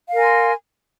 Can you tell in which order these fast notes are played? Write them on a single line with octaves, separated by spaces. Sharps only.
F5 A#4 G#5 C6